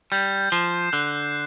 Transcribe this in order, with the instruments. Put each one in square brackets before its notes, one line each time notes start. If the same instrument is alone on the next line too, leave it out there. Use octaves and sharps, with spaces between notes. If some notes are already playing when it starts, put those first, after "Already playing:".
[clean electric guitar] G3 [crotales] G6
[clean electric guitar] F3 [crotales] C7 E7
[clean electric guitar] D3 [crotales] F#6